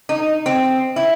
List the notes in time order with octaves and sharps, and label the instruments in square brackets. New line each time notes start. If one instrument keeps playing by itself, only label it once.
[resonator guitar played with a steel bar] D#4
C4
E4